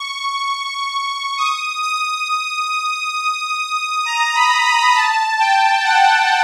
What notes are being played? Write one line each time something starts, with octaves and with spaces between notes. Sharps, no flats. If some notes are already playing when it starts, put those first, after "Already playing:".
Already playing: C#6
D#6
D#6
A#5
B5
B5
A5
G5
F#5